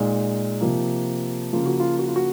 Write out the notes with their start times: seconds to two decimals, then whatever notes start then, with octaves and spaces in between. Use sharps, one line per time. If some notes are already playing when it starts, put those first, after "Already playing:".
Already playing: A#2 G#3 D#4
0.61 C3 F3 A#3
1.53 C#3 F3 A#3 F4
1.66 F#4
1.80 F4
1.99 F#4
2.08 F4
2.16 F#4